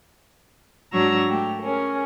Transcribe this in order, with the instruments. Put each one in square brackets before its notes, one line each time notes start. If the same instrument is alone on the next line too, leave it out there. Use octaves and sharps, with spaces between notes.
[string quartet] G#2 F#3 D4 A#5 C#6 E6
A3 G4
C#4 G#4 A#4